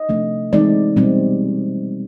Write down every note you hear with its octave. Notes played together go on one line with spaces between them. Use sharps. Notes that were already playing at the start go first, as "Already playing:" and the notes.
Already playing: D#5
C3 F3 A3 D4
E3 G#3 C4 D#4 D5
B2 G3 C4